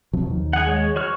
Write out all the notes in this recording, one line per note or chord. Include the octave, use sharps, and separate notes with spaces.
C3 F3 F#3
D#2 D#3
G#4 F#5
G#3 C#5
F#4 C#5 F6